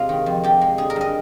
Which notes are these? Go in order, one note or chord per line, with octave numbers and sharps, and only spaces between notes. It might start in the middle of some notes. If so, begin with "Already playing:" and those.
Already playing: C3 G#3 F4
D#3
F2
F2 G4
G#3
D3 G#4
A#4
G2 D#5